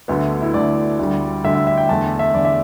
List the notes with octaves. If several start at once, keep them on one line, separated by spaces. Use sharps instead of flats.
D2 D3 A3 B3
E4
D2 D3 A3 D5
D2 D3 G3
D2 D3 G3 E5
E5
E5
G5
E2 D3 A3 A5
E5
E2 D3 A3 D5
E5